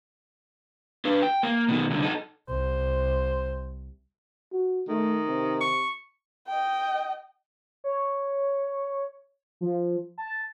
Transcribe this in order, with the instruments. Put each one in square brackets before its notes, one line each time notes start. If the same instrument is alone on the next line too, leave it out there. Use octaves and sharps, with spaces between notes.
[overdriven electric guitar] D4 B4
G5
A#3
B2 D#3
C2 D3
D#4 A4
[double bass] C2 [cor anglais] C5
[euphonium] F#4
[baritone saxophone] D#3 [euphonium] A3
[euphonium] C3
[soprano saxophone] C#6
[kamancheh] D#5 G5
[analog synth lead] C#5
F3
A5